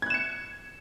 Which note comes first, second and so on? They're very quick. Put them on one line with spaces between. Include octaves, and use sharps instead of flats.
G#6 F#6 E7 C#7